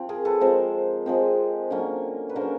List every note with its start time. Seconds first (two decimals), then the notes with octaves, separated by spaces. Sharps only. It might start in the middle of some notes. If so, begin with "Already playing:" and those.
Already playing: F3 C4
0.09 G#4 A#4
0.25 A4 B4
0.41 F3 G#3 C4 A#4 C5
1.06 F3 G#3 C4
1.70 D3 F#3 A#3 C#4
2.29 B4
2.36 D3 F#3 A#3 C#4 A#4 C5